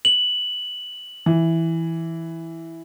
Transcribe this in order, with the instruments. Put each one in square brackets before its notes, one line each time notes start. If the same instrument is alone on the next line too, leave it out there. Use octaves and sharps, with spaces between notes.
[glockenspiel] F#7
[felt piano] E3